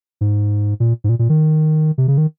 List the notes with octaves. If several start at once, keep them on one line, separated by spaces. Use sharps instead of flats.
G#2
A#2
G#2
A#2
A#2
D#3
C3
C#3
D#3